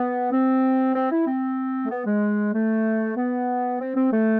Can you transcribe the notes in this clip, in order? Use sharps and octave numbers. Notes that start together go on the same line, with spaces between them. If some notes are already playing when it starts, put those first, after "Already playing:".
Already playing: B3
C4
C4
E4
C4
A3
B3
G#3
A3
B3
C4
C4
A3